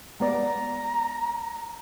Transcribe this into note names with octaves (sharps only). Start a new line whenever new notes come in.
G#3 B3 D5 A#5